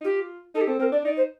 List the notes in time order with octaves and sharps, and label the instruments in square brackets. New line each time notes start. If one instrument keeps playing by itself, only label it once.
[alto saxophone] D#4
[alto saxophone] F4 [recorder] G4
[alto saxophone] D#4 [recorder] A4
[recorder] G4
[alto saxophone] C4 [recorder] A4
[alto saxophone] C4 [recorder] A#4
[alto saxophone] D4 [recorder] D5
[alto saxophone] D#4 [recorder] D5
[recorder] C5